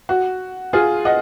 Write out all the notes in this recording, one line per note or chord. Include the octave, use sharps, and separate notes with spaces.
F#4
F4 G#4
D#5 F#5